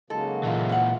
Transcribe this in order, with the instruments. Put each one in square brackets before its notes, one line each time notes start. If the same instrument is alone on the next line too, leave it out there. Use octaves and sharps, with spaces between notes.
[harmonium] C#3 F#3 A#3 [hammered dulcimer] G#3 D#4 [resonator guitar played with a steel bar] A4
[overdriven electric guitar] A#2 E3 [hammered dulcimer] F4 D#5 E5
[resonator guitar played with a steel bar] F5 F#5